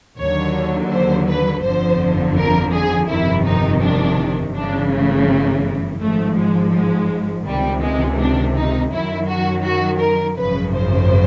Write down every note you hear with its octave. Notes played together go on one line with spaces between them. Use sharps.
D#2 D3 F#3 C#5
C5
B4
G1 F2 D3 F3 C5
A#4
G#4
G1 F2 C3 D#3 E4
D#4
D4
G1 F#2 C#3 E3 D4
A3
G#1 G#2 F3 A3
G#3
G#3
C#2 C3 D#3 G3
G#3
D4
D#4
F#2 D#3 F#3 E4
F#4
F#4
A#4
G#1 F#2 C#3 F3 B4
C5